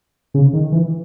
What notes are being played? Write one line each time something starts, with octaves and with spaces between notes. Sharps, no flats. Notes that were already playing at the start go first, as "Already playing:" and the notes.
C#3
D#3
E3